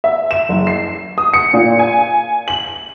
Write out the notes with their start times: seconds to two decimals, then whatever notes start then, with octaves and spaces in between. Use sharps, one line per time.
0.04 E5
0.31 E7
0.49 F#1
0.67 C7
1.18 D#6
1.34 C#7
1.54 A#2
1.79 G#5
2.48 F#7